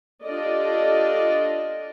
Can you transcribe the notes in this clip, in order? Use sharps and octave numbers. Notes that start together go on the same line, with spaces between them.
D4 F4 G4 A4 D5 D#5